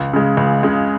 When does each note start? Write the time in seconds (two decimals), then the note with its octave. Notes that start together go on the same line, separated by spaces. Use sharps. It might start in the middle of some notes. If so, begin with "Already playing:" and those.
Already playing: C#2
0.13 C#3 G#3
0.37 C#2
0.63 C#3 G#3